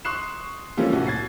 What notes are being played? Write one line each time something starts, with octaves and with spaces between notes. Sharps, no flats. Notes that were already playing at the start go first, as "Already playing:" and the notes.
C6 C#6 D#6 F#6 C7 E7
E3 F3 G3 A3 A#3 C#4
C2 A2 F#4
G#6 A6 C7